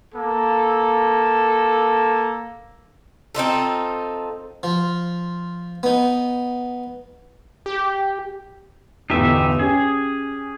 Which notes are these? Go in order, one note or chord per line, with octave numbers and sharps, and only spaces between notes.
A#3 A4
C4 D#4 F4 A4
F3
B3 D#4
G4
G1 E2 A2 D#4 G4 E5
C#4 G4 G#4